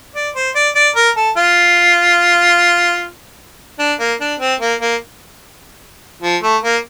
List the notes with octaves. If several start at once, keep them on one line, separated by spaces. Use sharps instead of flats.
D5
C5
D5
D5
A#4
A4
F4
D4
A#3
D4
C4
A#3
A#3
F3
A3
A#3